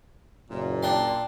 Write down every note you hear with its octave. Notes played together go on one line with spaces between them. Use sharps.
F#1 A#2
D4 G5 C6